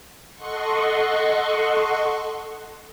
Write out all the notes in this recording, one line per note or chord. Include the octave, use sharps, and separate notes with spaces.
A4 D#5 F#5 C6 C#6